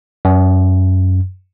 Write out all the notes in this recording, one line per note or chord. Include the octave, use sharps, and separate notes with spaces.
F#2